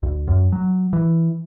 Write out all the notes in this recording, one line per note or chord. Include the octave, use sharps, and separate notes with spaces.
D2
F#2
F#3
E3